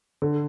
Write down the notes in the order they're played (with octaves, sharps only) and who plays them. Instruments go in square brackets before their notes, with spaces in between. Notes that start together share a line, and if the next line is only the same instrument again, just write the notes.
[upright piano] D3